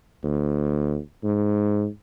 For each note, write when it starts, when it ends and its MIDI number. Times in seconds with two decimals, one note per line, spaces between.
0.24 0.98 38
1.24 1.86 44